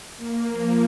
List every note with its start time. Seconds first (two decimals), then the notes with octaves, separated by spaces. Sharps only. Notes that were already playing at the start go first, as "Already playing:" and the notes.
0.18 A#3
0.50 F3